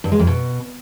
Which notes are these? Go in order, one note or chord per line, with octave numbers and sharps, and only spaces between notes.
G2
G#3
F2
B2